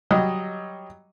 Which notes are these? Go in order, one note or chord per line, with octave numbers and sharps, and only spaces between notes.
F#3 G3 D#5